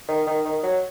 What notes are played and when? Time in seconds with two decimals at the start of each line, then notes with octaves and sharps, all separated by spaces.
0.08 D#3
0.27 D#3
0.45 D#3
0.63 F#3